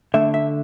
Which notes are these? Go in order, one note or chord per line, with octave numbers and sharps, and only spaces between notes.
D3 A3 E5
E5